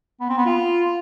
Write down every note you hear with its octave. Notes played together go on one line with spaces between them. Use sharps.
B3
C4
B3
F4